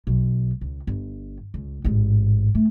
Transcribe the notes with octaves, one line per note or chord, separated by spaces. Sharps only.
B1
C#2
G1
C#2
A1 G#2
A3